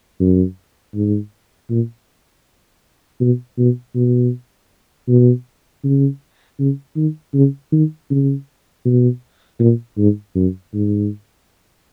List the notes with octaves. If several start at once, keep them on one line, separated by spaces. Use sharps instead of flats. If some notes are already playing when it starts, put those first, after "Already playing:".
F#2
G#2
A#2
B2
B2
B2
B2
C#3
C#3
D#3
C#3
D#3
C#3
B2
A#2
G#2
F#2
G#2